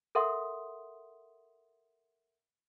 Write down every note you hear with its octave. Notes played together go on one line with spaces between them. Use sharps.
A4 A#4 E5 F#5 C6 D#6